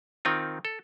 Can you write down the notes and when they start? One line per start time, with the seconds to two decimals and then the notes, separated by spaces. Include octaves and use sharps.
0.25 D#3 C4 D#4 F4
0.65 A4